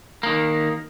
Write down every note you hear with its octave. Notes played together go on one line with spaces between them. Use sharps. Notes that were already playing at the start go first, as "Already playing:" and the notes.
D#3 A#3